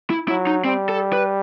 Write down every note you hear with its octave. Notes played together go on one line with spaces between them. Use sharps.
E4
F#3 E4
D#4
G3 C4
A4
B4